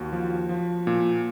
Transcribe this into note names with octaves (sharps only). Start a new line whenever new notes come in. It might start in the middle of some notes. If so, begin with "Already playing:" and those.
Already playing: D#2 F#4
F3
F3
A#2